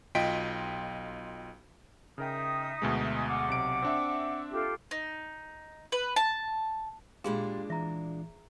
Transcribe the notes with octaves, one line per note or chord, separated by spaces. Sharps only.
B1 F4 D#5 G5 B6 D7
C#3 D#4 A#4 E5 G5 D#6
D2 B2 G#3
F#5 D6
B1 C3 D7
C4 D4 E5
F4 G4 A4
D#4
B4
A5
A#2 G#3 D4 F4 G4 G#4 F5 C6
E3 E5 A#5